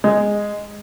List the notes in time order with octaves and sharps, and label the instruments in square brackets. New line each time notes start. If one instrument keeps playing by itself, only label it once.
[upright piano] G#3